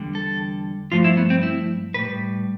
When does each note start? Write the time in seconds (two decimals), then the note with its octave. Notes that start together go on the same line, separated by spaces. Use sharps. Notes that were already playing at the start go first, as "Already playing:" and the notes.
Already playing: E2 D3 G3
0.15 A4
0.92 G2 F3 A3 F4
1.04 E4
1.17 B3
1.30 C4
1.43 E4
1.94 A2 G3 B4